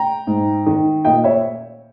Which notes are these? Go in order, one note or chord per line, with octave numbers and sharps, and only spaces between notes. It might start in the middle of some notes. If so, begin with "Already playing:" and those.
Already playing: G5 A#5
G#2
D#3
A#2 D#5 G5
C#5 E5